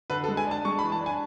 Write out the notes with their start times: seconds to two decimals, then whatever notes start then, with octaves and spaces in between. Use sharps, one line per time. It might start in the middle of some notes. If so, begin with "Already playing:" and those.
0.10 D3 B4
0.24 A4
0.28 G#3
0.37 G#5
0.46 D4 A5
0.65 G#3 C#6
0.79 B5
0.83 E3
0.92 A5
1.01 D4
1.06 G#5